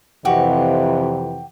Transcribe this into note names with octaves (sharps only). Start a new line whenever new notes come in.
F2 C3 E3 F#4 G4